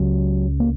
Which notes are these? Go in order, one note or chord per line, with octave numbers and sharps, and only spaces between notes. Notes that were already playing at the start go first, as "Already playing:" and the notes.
Already playing: C#2 C#3 F#3
A#3